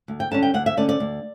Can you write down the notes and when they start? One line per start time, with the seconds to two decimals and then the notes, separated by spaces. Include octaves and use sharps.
0.08 D2
0.20 G5
0.31 D3 G3 C#4 A5
0.43 G5
0.54 D2 F#5
0.66 E5
0.77 D3 A3 C#4 D5
0.89 D5
1.00 D2